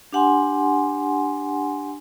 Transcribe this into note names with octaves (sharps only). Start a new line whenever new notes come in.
D4 G4 F#5 G#5 C6